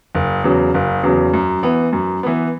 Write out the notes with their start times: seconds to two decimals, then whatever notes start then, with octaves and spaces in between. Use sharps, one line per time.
0.15 F#1
0.44 E2 C#3 F#3
0.74 F#1
1.04 E2 C#3 F#3
1.34 F#2
1.63 E3 B3
1.93 F#2
2.23 E3 B3